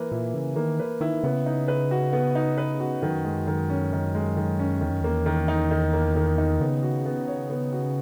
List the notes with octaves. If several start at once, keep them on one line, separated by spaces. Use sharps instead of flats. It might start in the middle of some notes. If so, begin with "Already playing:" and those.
Already playing: E3 A#3 B4
A#2 E4
C#3 E3
D#3 A#3
B4
D#3 E4
C#3 B3
D#4
B4
F#4
B3
D#4
B4
F#4
F#2 D#3
G#3
D#3
C#4
D#3
G#3
D#3
C#4
E2 D#3
F#2
E2 A#3
D#3
D#4
D#3
A#3
D#3
D#4
C#3 B3
F#4
B3
C#5
B3
F#4